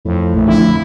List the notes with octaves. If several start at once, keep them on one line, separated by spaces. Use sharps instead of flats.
F2 A2
A#1 A3
F2 D3 E4